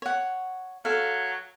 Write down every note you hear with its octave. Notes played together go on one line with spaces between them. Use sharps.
C#5 F#5
F#3 A4 F5